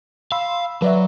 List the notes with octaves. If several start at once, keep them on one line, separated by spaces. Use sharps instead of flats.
F5 B5 C6 E6
F#3 B4 D5 E5